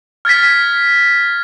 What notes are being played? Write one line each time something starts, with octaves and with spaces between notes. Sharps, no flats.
F6 G#6 A6 B6